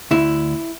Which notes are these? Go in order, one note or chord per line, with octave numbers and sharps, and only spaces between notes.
D2 E4